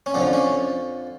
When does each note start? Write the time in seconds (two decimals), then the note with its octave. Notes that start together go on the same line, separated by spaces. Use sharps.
0.06 C#4
0.14 F2 D3 F3 D4
0.33 C#4